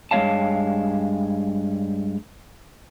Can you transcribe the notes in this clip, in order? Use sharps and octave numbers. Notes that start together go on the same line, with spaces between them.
G2 G#3 A3 C#5 F5 A5